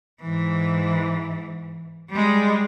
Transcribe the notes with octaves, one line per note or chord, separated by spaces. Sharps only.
G#2 E3
G3 G#3